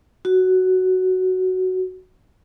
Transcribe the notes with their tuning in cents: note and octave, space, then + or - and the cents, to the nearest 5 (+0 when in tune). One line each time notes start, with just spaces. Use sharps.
F#4 +5